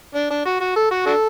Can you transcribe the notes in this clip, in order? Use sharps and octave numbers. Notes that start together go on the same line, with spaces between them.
D4
D4
F#4
F#4
A4
F#4
D4 F#4 A4